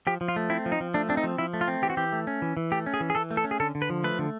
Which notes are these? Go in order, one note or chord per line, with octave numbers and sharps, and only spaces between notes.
F3 G4
F3
F4
A3
C4 E4
F3
D#4
F3
A3 D4
C4 D4
D#4
F3
F3 E4
A3
F4
C4
E3 G4
F#4
E3 G4
A3
C#4
E3
E3
A3 G4
C#4
G#4
E3
G#4
E3 A4
A3
A4
C#4
G#4
D3 A4
D3
B4
F3
A3 B4
D3